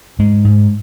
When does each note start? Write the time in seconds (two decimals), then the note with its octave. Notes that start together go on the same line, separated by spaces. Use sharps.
0.19 G#2 G#3
0.45 G#2